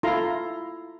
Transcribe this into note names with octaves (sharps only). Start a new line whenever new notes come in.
E4 F4 A4 F5 A#5 C6